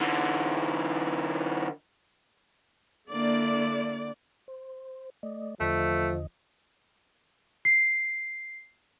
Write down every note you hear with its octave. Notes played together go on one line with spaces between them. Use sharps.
D3 E3
D3 A#3 E4 D5
C5
A3 D5 D#5
E2 D3 F3 A3 D#5
C7